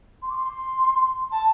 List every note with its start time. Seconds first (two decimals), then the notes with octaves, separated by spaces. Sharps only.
0.22 C6
0.29 D6
0.36 C6
1.31 A5